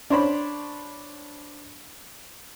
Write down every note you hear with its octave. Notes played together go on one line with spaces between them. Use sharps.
D4 C5 C#5 B5